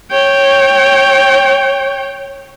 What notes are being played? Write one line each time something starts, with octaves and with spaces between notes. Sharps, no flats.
C#5 G5